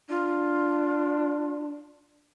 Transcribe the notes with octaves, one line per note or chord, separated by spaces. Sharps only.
D4 F4